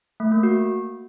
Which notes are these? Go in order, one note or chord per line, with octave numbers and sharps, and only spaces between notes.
A3
A#3
F#4